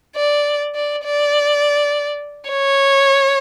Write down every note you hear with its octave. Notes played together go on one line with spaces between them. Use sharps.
D5
D5
D5
C#5